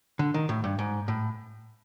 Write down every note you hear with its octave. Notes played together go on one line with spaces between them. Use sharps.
D3
D#3
A2
G2
G#2
A2